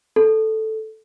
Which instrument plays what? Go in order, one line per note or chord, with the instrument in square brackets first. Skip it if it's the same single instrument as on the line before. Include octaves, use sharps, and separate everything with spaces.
[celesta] A4